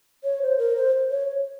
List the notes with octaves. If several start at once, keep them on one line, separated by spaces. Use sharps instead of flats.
C#5
C5
A#4
C5
C#5